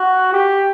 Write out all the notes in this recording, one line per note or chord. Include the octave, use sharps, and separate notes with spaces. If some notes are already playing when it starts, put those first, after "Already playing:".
Already playing: F#4
G4